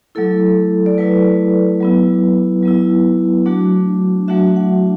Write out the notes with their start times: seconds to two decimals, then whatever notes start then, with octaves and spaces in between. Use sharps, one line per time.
0.15 F#3 A3 E4 A4
0.86 D5
0.98 F#3 A3 E4 B4
1.81 F#3 B3 E4
2.63 F#3 B3 E4
3.46 F#3 A3 D4 F#4
4.28 F#3 A3 D4 F#4 E5
4.56 F#5